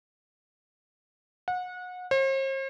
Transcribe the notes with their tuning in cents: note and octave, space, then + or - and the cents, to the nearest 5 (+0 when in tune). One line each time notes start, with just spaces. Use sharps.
F#5 -30
C5 +45